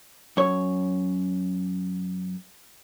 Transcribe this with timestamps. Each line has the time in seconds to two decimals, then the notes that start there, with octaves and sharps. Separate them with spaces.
0.37 F#2 C#5